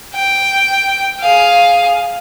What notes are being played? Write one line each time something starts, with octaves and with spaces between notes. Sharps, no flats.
G5
G#4 F5